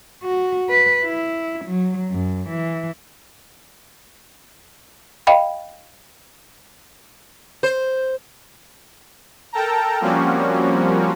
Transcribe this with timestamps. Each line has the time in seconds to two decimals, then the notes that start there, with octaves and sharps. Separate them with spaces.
0.23 F#4
0.69 B4
1.04 E4
1.65 F#3
2.11 F#2
2.49 E3
5.27 D#5 F5 G5 B5
7.63 C5
9.53 A4 A#4 G5 A5 A#5
10.01 F3 G3 A#3 C4 C#4 F#4